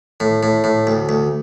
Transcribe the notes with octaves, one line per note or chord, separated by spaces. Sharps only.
A2
A2
A2
D2
D2